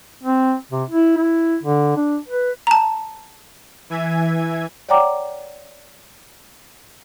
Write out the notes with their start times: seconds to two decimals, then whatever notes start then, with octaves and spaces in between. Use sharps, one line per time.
0.24 C4
0.72 C3
0.90 E4
1.17 E4
1.63 D3
1.96 D4
2.28 B4
2.67 A5 A#5
3.90 E3 E5 G#5 G#6
4.89 C#5 D5 F#5 G5 A#5 D6